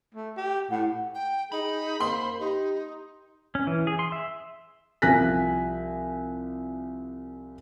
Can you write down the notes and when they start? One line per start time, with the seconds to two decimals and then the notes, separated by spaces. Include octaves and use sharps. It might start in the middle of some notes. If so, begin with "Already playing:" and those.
0.15 A3
0.37 G4
0.71 A2 F#5
1.14 G5
1.52 D#4 G#4 B5
2.00 A#3 C5 C6
2.40 D#4 G4
3.55 C#4
3.67 E3
3.87 G#4
3.99 C6
4.12 E5
5.02 C2 F3 G#5 F#6 A#6 B6